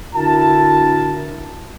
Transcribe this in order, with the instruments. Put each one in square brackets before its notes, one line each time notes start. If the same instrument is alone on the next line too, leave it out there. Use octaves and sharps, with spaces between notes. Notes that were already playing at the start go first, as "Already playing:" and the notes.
[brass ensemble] D3 E4 F#4 A#4 A5